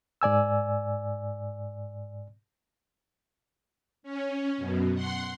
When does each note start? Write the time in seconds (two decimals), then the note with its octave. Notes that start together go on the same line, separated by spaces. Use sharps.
0.21 G#2 D5 G#5 E6
4.03 C#4
4.57 F#2 B2
4.94 F#5 C6